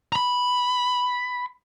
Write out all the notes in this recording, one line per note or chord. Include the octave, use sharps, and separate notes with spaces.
A#5 B5